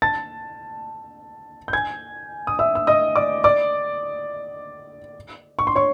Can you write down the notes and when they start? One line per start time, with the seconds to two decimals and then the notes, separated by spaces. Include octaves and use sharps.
0.02 A5 A6
1.68 G6
1.73 G#5 G#6
2.47 D#6
2.59 E5 E6
2.75 E6
2.87 D#5 D#6
3.16 D5 D6
3.44 D5 D6
5.59 C#6
5.67 C6
5.75 C#5 C#6